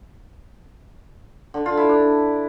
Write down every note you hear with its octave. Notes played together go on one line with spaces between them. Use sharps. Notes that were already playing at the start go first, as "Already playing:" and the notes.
D3
F4
E4
D4